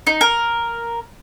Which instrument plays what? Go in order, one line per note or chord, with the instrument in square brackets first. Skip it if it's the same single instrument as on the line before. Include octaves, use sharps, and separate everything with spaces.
[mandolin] D#4
A#4